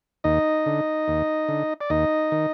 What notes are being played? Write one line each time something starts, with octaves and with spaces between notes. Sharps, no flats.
D#2 D#4 D#5
D3
D#2
D3
D5
D#2 D#4 D#5
D#3